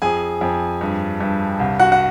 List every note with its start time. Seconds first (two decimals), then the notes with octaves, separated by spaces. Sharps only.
0.02 F2 G#4 G#5
0.41 F2
0.81 G2
1.21 G2
1.60 C2
1.80 F#4 F#5
1.92 F#5